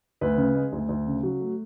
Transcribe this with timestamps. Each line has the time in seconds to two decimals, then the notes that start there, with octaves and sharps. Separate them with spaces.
0.21 D2 B4
0.37 C#3
0.55 G#3
0.72 D2
0.89 D2
1.07 C#3
1.23 F#3
1.40 A3